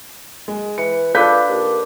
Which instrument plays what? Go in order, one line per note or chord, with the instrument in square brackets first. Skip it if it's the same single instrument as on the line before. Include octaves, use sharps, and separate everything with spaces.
[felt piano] G#3
[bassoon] E3 [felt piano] C#7
[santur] D4 A4 D5 [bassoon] F4 [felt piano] B4 G6 B6
[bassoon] D#2